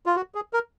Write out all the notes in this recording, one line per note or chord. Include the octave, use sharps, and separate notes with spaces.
F4
F#4
G#4
A#4